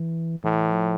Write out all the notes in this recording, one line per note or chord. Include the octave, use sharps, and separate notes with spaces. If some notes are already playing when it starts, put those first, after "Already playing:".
Already playing: E3
A2 E3
F3